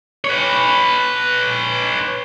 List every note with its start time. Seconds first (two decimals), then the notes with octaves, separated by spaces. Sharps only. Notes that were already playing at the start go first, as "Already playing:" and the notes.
0.25 B4 C#5